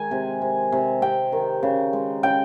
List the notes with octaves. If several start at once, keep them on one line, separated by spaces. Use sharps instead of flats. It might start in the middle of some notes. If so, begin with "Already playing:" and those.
Already playing: D#3 G#3 G#5
C3
C3
C3
C3 G5
D#3
C#3
G#3
C#3 G5